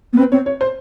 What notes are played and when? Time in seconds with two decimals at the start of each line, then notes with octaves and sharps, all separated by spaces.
0.13 B3
0.17 C4 B4
0.32 C4 C#5
0.46 C#5
0.61 C5